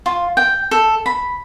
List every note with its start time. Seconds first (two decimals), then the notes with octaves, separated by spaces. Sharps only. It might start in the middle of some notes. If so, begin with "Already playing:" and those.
0.06 F4
0.37 G5
0.71 A4
1.06 B5